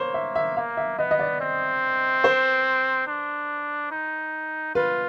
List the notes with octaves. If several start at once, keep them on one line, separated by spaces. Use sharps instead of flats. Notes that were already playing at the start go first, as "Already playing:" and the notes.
Already playing: A#3 C5 C#5
E5
E5
A#3 F5
E5
B3 D#5
D#5
D5
C4
C5
D4
D#4
F4 B4